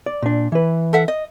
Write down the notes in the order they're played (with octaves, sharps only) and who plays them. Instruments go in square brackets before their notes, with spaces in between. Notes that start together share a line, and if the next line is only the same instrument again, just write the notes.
[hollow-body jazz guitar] D5
A#2 D4
E3 B4
[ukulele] A4 E5 F#5
D#5